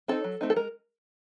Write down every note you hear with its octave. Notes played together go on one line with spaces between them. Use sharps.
C4 D#4 A4
F#3
A3 C4 D#4
A4
G#3 A#4